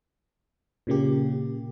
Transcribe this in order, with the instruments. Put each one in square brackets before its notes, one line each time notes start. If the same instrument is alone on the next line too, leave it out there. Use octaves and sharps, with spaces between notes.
[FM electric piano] A#2 C#3 A#3 G4